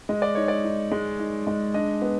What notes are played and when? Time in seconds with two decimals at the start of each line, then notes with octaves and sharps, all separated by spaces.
0.09 G#3 D#5
0.22 D5
0.35 D#4 C#5
0.48 D5
0.64 D#4
0.92 G#3
1.19 D#4
1.47 G#3
1.74 D4 D#5
2.02 B3